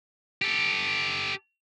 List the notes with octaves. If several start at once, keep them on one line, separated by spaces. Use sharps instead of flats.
G4 A4